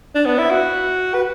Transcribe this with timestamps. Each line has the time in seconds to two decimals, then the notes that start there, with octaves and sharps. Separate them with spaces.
0.15 D4
0.26 B3
0.38 E4
0.50 F#4
1.14 B4